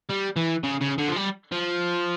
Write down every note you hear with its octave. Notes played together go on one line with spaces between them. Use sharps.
G3
E3
C#3
C#3
D3
F3
G3
F3